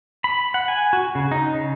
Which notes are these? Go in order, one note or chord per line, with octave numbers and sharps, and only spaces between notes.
B5
F#5
G#5
F#4
C#3
D#4
C#3